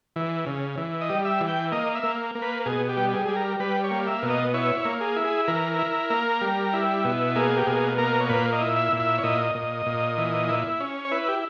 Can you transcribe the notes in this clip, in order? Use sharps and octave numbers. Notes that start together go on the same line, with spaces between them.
E3
C#3
E3
D#5
G3
E5
E3
G5
A#3 D#5
E5
A#3
A#3
B4
B2 G#4
G4
G3
G#4
G3 G#4
A#4
G3 B4
C#5
A#3
E5
B2
D#5
E4 C#5
C#5
A#3
G#4
E4
G#4
E3 A#4
E4
A#3
G3
E4
B2
A#3 G#4
G4
B2 G#4
A#3 A#4
C#5
A#2 B4
D#5
E4
E5
A#2
E5
C#5
A#2 D#5
A#2
A#2
E3
E4
C#4
C#5
E4 B4
G4